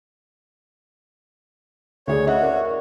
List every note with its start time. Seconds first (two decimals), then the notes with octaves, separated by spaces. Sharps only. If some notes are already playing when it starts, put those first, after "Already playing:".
2.07 D2 G#4 C#5 D5
2.27 F#4 D#5 E5 F#5
2.42 A#4 D5 E5